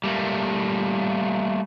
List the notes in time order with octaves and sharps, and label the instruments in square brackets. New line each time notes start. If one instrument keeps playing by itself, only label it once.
[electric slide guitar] G3 A3 A#3